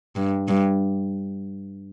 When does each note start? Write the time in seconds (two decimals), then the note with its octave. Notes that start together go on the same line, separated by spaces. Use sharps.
0.16 G2
0.48 G2